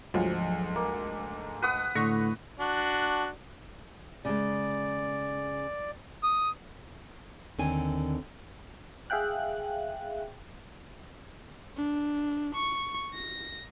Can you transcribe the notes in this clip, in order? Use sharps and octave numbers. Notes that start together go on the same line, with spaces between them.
D2 G#2 F3 F#3
A#3
B4 F#5 D#6
A2 D3 C#6 A#6
D4 F#4
C#3 G#3 D5
D#6
D#2 D3 C4 C#5 G#5
G#4 E5 F5 G5 F#6
D4
C#6
A#6